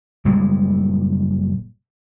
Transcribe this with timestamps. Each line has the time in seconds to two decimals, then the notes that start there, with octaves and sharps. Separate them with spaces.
0.25 F#1 A#2 G3 G#3